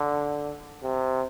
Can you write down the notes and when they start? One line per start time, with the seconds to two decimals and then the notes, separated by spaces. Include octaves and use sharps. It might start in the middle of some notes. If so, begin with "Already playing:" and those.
Already playing: D3
0.83 C3